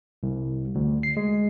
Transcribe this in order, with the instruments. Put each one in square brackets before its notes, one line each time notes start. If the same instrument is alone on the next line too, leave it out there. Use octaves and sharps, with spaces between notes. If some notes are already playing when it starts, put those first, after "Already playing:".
[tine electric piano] C2
D2
C7
G#3